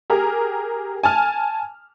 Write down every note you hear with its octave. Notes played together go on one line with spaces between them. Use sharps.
G4 G#4 A#4
G#5 A5 F6